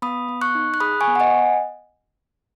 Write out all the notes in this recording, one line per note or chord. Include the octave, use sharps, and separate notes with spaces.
B3 B5 D#6
B3
C#6 F#6
D#4
F#6
G#4 B5 D#6
G#5 C#6
B3
F#5
D#5 G#5